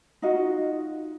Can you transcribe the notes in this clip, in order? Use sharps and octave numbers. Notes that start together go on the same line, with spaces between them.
D#4 F4 F#4 D#5